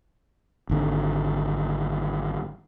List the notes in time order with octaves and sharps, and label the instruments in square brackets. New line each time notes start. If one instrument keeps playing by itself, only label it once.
[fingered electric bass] G#1 D3